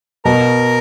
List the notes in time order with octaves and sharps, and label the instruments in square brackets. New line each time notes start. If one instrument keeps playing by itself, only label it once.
[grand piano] B2 [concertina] A#4 A#5